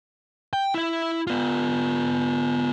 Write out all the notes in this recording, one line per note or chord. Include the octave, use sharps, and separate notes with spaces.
G5
E4 E5
B3 F4